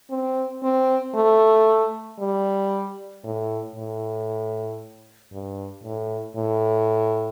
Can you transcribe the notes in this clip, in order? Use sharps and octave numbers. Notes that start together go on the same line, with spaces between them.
C4
C4
A3
G3
A2
A2
G2
A2
A2